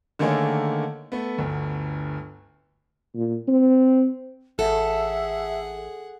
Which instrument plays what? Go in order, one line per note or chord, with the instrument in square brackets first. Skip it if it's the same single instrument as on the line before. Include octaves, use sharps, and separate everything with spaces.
[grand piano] D3 D#3 A3 A#3 G#4 C#5
A3 B3
G1 D2
[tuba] A#2
C4
[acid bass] A1 [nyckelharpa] G#4 F#5 [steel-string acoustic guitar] A4 [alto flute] E5